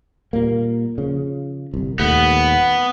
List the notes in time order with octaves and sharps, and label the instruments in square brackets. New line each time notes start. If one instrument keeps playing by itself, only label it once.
[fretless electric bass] A#2 G3 A#3
C#3 F3
G1 C2
[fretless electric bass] D#1 D#2 A3 [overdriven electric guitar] B3